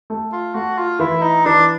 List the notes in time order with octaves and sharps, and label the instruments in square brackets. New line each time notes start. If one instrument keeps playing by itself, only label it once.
[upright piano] A3
[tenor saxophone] F4
[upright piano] A3 [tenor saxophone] F#4
[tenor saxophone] F4
[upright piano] E3 [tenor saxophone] E4
[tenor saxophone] D#4
[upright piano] E3 [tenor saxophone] D4